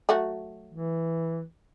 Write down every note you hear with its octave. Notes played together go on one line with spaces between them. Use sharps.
F#3 A3 F#4
E3